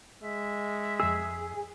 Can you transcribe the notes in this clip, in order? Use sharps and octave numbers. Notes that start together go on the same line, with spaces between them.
G#3 E5
F2 G#4 E6